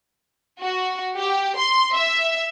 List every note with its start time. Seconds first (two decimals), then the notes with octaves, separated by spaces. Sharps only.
0.63 F#4
1.16 G4
1.57 C6
1.95 E5